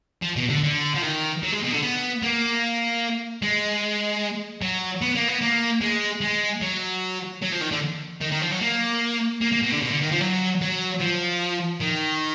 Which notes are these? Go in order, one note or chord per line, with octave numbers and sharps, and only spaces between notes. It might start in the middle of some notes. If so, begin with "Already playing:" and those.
F3
B2
D3
D3
F3
D#3
F#3
G#3
B2
D3
B3
A#3
G#3
F#3
B3
A#3
B3
A#3
G#3
G#3
F#3
F#3
F3
D#3
D3
D#3
D#3
F3
F#3
A#3
A#3
A#3
B2
D3
B2
D3
D#3
F3
F#3
F#3
F3
D#3